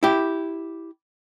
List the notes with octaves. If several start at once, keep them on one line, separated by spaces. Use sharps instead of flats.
E4 G4